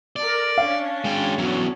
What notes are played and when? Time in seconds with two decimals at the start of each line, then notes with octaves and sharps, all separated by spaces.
0.16 A4 A#4 D5
0.58 C#4 D4 C#5 F5
1.05 G#3 G5
1.38 E2 F#3